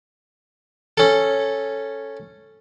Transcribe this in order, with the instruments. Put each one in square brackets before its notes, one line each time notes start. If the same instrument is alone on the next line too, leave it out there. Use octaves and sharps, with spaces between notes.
[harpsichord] C#4 A4